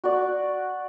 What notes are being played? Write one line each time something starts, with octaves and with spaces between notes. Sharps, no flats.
F#4 D5